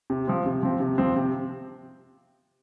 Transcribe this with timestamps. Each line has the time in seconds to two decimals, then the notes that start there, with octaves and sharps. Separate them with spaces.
0.10 C3
0.27 F3 C4
0.46 C3
0.63 F3 C4
0.80 C3
0.98 F3 C4
1.16 C3